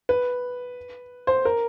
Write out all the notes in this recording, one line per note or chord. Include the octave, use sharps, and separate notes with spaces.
B4
C5
A#4